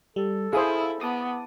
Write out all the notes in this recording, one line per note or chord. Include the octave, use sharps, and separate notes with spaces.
G3 A4
E4 G#4 C5 F5 D#6
B3 A5 D6 D#6